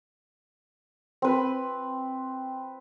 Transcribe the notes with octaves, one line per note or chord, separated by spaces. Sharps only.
C4 B4